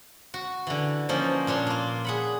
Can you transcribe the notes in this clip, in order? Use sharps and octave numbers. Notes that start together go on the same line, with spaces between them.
F#4
D3 E3
F3 A#3 C#4 D#4
A#2 D4 C#5 C6
A#3 F4
G#4 F#5 B5